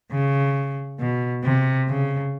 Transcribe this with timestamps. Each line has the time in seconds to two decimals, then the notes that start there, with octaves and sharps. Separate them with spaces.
0.11 C#3
0.99 B2
1.44 C3
1.88 C#3